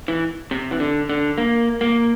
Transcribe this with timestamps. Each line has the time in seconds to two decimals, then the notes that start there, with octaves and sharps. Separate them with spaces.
0.08 E3
0.51 C3
0.71 E3
0.80 D3
1.09 D3
1.38 A#3
1.81 A#3